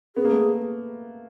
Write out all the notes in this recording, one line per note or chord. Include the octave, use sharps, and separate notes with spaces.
B3 G#4
A#3
A3 B3